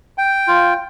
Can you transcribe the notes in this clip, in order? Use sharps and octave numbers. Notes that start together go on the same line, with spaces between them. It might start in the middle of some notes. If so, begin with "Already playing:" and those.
G5
F4